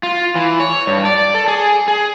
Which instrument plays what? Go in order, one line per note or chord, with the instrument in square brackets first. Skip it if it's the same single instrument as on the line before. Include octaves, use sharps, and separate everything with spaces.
[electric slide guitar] F4
E3
C#5
G2
D5
A4
G#4
G#4